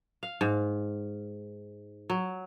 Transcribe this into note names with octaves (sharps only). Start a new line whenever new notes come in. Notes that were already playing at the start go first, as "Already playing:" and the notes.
F5
G#2
F#3